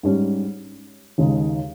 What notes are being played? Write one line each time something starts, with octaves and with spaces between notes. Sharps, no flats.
G#2 G3 C#4
D#2 C#3 G#3 D#4